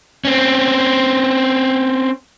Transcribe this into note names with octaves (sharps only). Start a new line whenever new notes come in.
C4 C#4